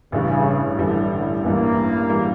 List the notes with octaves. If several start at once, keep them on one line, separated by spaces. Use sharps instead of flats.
A1 G2 C#3 E3 G3
A1 G2 D3 E3 G3
D3
A1 G2 E3 G3 A#3
E3 G3